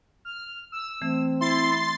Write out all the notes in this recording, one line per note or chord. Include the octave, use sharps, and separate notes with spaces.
F6
E6
E3 A3 C4
E4 C6 A6 C7